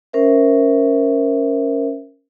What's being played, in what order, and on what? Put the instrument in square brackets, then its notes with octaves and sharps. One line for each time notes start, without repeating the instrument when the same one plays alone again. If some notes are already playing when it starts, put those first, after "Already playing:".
[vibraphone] C#4 A#4 C5 E5